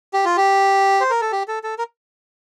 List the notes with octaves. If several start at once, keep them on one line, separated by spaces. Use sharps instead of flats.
G4
F4
G4
C5
A#4
A4
G4
A4
A4
A#4